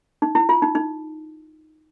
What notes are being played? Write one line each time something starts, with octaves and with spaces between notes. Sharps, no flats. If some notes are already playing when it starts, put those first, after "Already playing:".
D#4
E4
F4
D#4
D#4